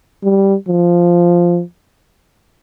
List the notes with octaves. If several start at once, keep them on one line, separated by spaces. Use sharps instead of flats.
G3
F3